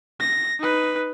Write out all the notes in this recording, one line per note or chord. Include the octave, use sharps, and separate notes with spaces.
A#6
D#4 B4